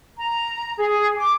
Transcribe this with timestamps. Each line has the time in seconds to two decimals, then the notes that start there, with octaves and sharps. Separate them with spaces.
0.17 A#5
0.77 G#4
1.16 D6